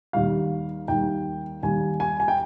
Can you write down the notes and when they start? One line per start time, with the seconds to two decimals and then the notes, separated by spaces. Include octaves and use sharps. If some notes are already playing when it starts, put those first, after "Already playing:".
0.13 D#2 D#3 G3 F5
0.88 D#2 D#3 G3 G5
1.63 D#2 D#3 G3 G#5
2.00 G#5
2.20 G#5
2.28 G5